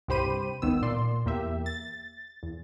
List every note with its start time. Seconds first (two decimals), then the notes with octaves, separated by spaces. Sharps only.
0.08 C2 G2 G4 C5 B5 D#7
0.62 G1 C#2 D#3 B3 E6
0.82 A#2 D5 C6
1.26 E2 A#3 G4 E5
1.66 A6
2.43 E2